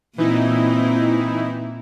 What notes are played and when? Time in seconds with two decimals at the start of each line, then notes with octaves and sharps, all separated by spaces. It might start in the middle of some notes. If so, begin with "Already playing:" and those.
0.18 A#2 E3 C4 D#4 E4